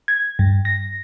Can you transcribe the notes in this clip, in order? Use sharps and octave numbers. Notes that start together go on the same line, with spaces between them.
G#6
G2
A#6